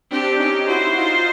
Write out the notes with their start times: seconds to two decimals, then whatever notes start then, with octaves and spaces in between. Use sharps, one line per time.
0.11 C4 D4 G4
0.39 C#4 D#4
0.68 E4 F#4 C5
0.97 D#4 F4